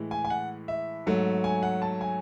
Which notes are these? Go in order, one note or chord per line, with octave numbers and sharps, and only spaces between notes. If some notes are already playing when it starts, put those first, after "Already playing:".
Already playing: A2 E3 G#3
G#5
G#5
F#5
E5
G#2 F#3 A3
G#5
F#5
A5
G#5